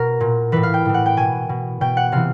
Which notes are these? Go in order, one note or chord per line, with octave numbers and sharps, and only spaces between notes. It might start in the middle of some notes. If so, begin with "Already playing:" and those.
Already playing: B2 A#4
A#2
A2 E3 B4
F5
G5
A2 E3
F#5
G5
B2 G#5
B2
B2 G5
F#5
C3 E3 F5